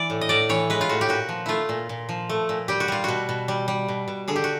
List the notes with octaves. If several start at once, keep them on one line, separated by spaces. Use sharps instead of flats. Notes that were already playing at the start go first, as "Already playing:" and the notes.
Already playing: E3 D5
A2
D#5
A2 D5
E3 C#5
G#3 B4
F4
A2 F#4
G4
A#2 F#4
F3
A3 E4 F4
A#2
A#2
F3
A3
A#2
G3 G4
F#4
G3 F4
B2 F#4
B2
G3
G3
B2
B2
D3 G#4
G4
F#4